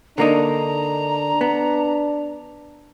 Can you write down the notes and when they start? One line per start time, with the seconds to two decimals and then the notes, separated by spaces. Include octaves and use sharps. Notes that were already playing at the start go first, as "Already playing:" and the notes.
0.18 D3 A#3 D4 D#4 A#5
1.41 B3